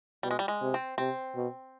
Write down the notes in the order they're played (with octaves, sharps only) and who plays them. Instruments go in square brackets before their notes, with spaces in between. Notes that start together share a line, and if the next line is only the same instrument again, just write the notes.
[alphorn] B2 [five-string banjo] G3
[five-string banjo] G#3
G3
G#3
[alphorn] C3
[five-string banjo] C4
[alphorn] C3 [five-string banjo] C4
[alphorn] B2